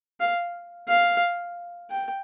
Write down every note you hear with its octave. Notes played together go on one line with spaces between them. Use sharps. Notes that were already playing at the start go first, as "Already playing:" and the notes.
F5
F5
G5